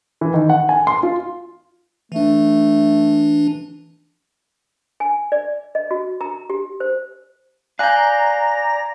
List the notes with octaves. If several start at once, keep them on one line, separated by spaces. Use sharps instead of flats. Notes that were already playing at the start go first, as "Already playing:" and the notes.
E3
D#3
F#5
G#5
C6
F4
E3 A3 D4
G#5
D5
D#5
F#4
A#5
G4
C5
D5 F5 G#5 A#5 F#6 G6 A#6